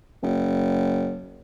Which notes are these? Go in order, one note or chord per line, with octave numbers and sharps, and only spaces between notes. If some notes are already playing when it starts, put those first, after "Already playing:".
F#1